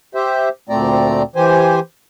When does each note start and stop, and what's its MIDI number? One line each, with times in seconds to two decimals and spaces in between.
0.15 0.49 67
0.15 0.49 72
0.15 0.49 76
0.69 1.22 38
0.69 1.22 46
0.69 1.22 57
0.69 1.22 60
0.69 1.22 74
0.69 1.22 82
1.35 1.80 52
1.35 1.80 67
1.35 1.80 72
1.35 1.80 80